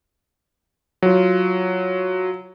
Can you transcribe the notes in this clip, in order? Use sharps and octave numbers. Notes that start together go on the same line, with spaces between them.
F#3 F4